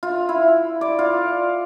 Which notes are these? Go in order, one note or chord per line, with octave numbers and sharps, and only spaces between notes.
F4
E4
D5
F4